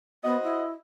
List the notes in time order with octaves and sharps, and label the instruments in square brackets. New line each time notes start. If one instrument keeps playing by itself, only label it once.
[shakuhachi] B3 [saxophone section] F#4 C5 D#5
[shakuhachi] E4